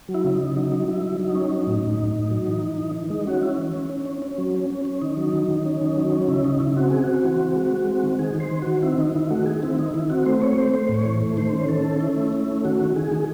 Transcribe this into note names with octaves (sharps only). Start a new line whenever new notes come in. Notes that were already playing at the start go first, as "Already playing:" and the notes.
F#3
E4
C#3 E4
C#3 D#4
F#3 D#4
F#3
F#3 E4
F#3
F#3 D#4
C#4
F#3
A2
A2
A2
A2
F#3
E3
E3
E3
E3
G#3 D#4
C#4 F#4
C#4 E4
E3
C#4
C#4
C#4
C#4
F#3
C#4
C#4
C#4
D#3 D#4
F#3
D#3
D#3
C#4
D#3
F#3
C#4
C#3 E4
C#3 D#4
C#3 E4
C4 F#4
C4 G#4
C4 F#4
E3
C4
G#3
G#3
C4
D#3
D#3 G#4
D#3
C5
D#3
D#3 F#4
C4 E4
D#3 D#4
D#3 E4
A3 F#4
D#3 G#4
C4 E4
D#3 D#4
D#3 E4
C4 F#4
A3 C5
C4 C#5
A3 C5
A3 C5
A2
C#5
E3
A3
D#3 C5
C#4
D#3 A4
C#4
C#4 E4
A3
C#4
A3
D#3 F#4
D#3
D#3 G#4
D#3